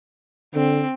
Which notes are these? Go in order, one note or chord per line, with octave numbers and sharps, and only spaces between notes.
D3 C4